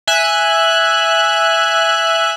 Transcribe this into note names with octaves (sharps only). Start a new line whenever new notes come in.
E5 G#5 F#6